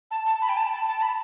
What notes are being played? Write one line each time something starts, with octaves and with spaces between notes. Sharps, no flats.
A5
A5
B5
G5
A5
A5
A5
A5
B5